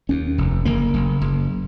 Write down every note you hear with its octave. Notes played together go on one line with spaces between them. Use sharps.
D#2 C#4
F1
F#1 A#3
F#1
F#1